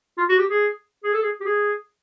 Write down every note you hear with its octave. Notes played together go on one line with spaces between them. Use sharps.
F4
F#4
G4
G#4
G#4
A4
G#4
G4
G#4